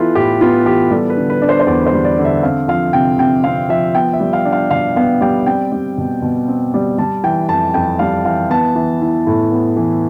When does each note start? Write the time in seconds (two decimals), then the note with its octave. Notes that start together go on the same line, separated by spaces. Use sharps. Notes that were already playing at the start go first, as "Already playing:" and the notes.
Already playing: E3 B3 E4 F4 A4 B4
0.15 A2 G4
0.41 B3 F4
0.66 E3 G4
0.91 G3 A4
1.10 B4
1.17 D3
1.30 B4
1.42 D4
1.49 C5
1.60 C5
1.67 E2 D5
1.87 C5
1.93 G3
2.05 D5
2.18 D3
2.25 E5
2.43 C4 F5
2.68 F3 F5
2.93 C3 G5
3.19 C3 G5
3.44 C4 F5
3.69 F3 E5
3.95 B3 G5
4.13 E5
4.20 G3
4.33 F5
4.45 D4
4.52 F5
4.71 B2 F5
4.96 B3 F5
5.21 G3 G5
5.46 C4 G5
5.72 G3
5.98 B2
6.22 B2
6.48 C4
6.74 G3
6.98 G3 A5
7.24 E3 G5
7.49 F2 A5
7.74 F2 G5
7.99 G3 F5
8.25 E3 F5
8.50 B3 A5
8.75 E3
9.01 E4
9.27 A2
9.51 B3
9.77 E3